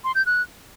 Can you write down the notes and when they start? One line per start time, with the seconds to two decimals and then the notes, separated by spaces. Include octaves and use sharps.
0.04 C6
0.15 G6
0.26 F#6